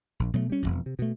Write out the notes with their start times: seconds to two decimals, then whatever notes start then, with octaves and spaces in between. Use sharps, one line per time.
0.20 A#1
0.34 B2 F#3 G3 A3
0.50 G3 C#4
0.62 E1 A#1 F2
0.86 C3
0.99 B2 A3